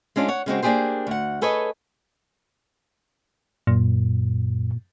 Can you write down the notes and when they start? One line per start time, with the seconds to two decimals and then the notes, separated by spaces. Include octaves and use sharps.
0.16 G#3 C#4 D4 F4
0.28 C#5 F#5
0.46 C#3 G#3 C4 F#4
0.63 A#3 D4 D#4 G4 G#4 C5
1.07 D2 F#5
1.41 G#4 A4 B4 C#5 D#5
3.67 F#2 A#2